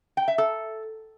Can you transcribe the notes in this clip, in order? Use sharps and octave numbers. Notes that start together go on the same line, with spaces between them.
G5
E5
A4